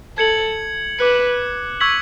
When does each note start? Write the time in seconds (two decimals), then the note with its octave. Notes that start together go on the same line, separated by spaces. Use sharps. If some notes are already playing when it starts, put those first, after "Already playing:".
0.18 A4 G#6 C#7 F#7
0.99 B4 D6 F#6 C#7
1.80 C#6 E6 G#6 B6 F#7